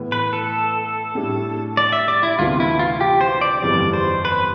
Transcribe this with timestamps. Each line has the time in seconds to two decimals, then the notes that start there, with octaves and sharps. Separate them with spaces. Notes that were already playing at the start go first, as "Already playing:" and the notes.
Already playing: A2 E3 B3
0.12 B4
0.33 A4
1.15 A2 G3 D4
1.77 D5
1.92 E5
2.08 D5
2.23 E4
2.39 D2 C3 E3 B3 F4
2.60 E4
2.79 F4
3.01 G4
3.21 C5
3.41 D5
3.62 G1 F2 E3 G3 D5
3.93 C5
4.25 B4